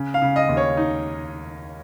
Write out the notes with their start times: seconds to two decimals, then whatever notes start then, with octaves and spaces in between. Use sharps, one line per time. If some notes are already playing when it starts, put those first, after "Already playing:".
Already playing: C#3
0.14 F5
0.22 C#3
0.36 D#5
0.49 D#2
0.57 C#5
0.77 D#4